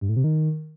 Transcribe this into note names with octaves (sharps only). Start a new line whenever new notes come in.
G2
A2
C3
D#3